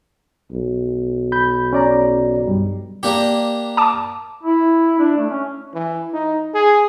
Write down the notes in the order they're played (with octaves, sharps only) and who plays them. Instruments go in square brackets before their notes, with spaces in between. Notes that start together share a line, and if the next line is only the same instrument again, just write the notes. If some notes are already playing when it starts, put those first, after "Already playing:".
[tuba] B1
[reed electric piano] B5 G6
C#4 D5 A#5
G2 G3
[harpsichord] A#3 D4 G4
[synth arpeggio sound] A5 D6
[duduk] E4
D4
A3
C#4
[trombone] E3
D#4
G#4